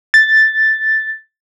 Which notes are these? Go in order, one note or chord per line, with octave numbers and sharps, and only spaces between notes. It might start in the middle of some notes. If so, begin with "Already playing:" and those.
A6